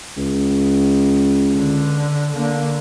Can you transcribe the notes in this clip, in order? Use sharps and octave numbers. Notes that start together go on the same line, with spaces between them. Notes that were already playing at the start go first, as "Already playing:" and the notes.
C#2
D3
D3 A#3